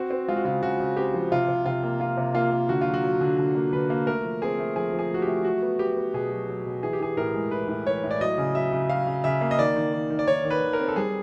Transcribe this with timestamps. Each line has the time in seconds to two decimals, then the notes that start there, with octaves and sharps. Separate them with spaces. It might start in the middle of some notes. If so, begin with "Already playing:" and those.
Already playing: C4 F#4
0.11 C4
0.28 G#3 F4
0.36 F#4
0.45 C#3 F4
0.62 C#3 F#4
0.80 C#3
0.97 C4 G4
1.14 F3
1.32 C3 F4
1.48 C3
1.66 C3 F4
1.83 A#3
2.00 A#3 F4
2.17 C3
2.35 A#3 F4
2.51 A#3
2.69 D3 F#4
2.81 F#3 F4
2.94 F#4
3.03 F#3
3.21 D3
3.39 D3
3.55 A#3
3.73 D3 B4
3.90 A#3
4.07 A3 A#4
4.24 F3
4.42 C4 G#4
4.59 A3
4.76 F3 G#4
4.93 F3
4.99 G#4
5.11 A3 F#4
5.22 G4
5.27 A3
5.45 F#3 F#4
5.62 B3
5.79 B3 G4
5.97 B3
6.14 B2 G#4
6.31 F#3
6.48 F#3
6.66 B2
6.83 E3 G#4
6.93 G4
7.00 E3 G#4
7.17 A2 A#4
7.34 G#3
7.51 E3 B4
7.69 A2
7.86 E3 C#5
8.04 A2
8.11 D5
8.21 F#3 D#5
8.38 C#3
8.55 F#3 E5
8.73 C#3
8.90 F#3 F5
9.07 C#3
9.24 C#3 E5
9.41 A#3
9.51 D#5
9.59 D#3 D5
9.76 D#3
9.93 D#3
10.10 D#3
10.19 D5
10.27 D#3 C#5
10.44 D#3
10.50 B4
10.62 D#3
10.73 A#4
10.79 C4
10.88 A4
10.96 G3 G#4